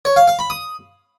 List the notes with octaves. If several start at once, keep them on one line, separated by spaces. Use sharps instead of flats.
C#5
F5
F5
B5
D#6